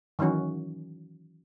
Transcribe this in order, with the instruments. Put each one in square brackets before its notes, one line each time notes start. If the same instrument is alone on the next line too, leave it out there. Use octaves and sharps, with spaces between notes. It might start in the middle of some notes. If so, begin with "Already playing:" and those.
[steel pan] D#3 E3 F#3 C#4 F#4